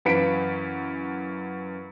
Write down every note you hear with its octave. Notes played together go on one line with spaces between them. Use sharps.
F#2 E3 B4 F5 B6 D7